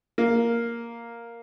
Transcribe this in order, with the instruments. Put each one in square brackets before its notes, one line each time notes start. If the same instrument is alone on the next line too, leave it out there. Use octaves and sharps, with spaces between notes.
[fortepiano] A#3